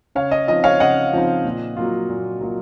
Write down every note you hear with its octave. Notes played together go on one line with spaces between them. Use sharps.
C#3 C#5 F5
D#5
F3 C4 D#4 D#5
C#5 F5
C#3 D#5 F#5
F3 C4 D#4
A#2
F#3 A#3 F4
A#2
F#3 A#3 F4